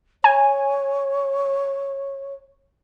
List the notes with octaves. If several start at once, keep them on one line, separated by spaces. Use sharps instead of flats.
C#5 G#5